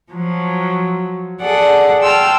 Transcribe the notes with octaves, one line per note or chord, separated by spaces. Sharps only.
F3 F#3
G#4 A4 D5 F#5
G5 A5 C6 E6 F6